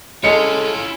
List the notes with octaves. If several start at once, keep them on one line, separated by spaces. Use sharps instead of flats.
G#3 E4 F4 A4 C#5 G#5 C#7